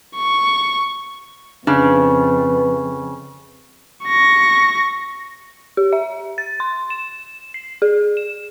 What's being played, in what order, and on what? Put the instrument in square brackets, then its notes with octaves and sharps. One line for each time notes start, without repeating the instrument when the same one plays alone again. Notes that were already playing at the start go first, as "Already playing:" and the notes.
[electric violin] C#6
[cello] F2 [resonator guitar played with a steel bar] C#3 [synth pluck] D4 [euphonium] B4
[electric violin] C#6 A#6
[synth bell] G4
E5
A6
C6
E7
C7
G#4
E7